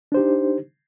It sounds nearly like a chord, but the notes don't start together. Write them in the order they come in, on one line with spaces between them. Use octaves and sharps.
D4 C5 G4 D#4